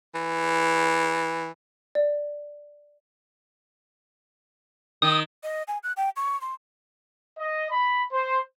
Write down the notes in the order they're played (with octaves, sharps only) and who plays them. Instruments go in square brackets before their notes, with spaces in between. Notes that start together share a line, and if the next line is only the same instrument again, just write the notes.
[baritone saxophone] E3
[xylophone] D5
[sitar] D#3 [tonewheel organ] D#6
[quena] D#5
G#5
F#6
G5
C#6
C6
[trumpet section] D#5
B5
C5